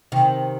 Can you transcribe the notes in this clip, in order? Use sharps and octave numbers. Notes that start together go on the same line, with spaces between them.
C3 D#3